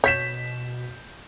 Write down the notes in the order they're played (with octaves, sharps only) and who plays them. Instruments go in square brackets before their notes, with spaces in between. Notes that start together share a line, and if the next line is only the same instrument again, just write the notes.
[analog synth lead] B2 [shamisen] C#5 [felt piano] G6 B6 E7